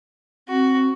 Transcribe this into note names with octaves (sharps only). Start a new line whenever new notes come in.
C4 F#4